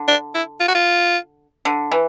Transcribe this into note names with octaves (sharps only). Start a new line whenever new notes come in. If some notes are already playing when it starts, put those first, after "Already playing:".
Already playing: D3
D4
E4
F4
F#4
F4
D3
E3